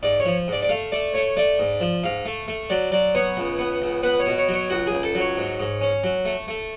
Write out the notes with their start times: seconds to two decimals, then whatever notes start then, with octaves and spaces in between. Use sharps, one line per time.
0.03 G#2 D5
0.20 C#5
0.25 F3
0.48 G#2 D5
0.62 D5
0.69 A3 F5
0.92 A3 D5
1.14 A3 C#5
1.37 A3 D5
1.59 G#2
1.81 F3
2.04 G#2 F5
2.25 A3
2.48 A3
2.70 F#3 D5
2.92 F#3 D5
3.15 B3 C#5
3.37 C#2
3.59 B3
3.82 C#2
4.03 B3 B4
4.20 C#5
4.26 B2
4.37 C#5
4.49 F#3
4.54 C#5
4.70 C#2 F#4
4.87 G#4
4.92 C#2
5.03 A4
5.15 F#3
5.20 C#5
5.37 G#2
5.60 G#2
5.81 C#4
6.04 F#3
6.25 A3
6.48 A3